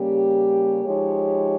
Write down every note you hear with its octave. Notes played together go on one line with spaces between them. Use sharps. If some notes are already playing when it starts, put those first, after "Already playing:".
Already playing: C#3 G3 A#3 C#4 G4
F3 G#3 D#4 G4 C#5